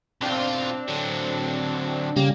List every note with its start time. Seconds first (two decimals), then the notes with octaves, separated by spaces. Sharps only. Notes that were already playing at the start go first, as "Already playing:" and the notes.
0.21 B1 C4 D4 F4
0.88 D3 F#3
2.16 C#3 G3 A#3